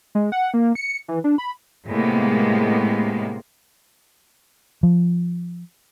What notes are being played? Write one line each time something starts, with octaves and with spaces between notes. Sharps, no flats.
G#3
F#5
A#3
C#7
E3
D4
B5
A2 C3 G#3 A#3 B3
F3